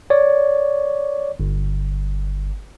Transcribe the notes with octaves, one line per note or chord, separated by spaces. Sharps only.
C#5 D5
G1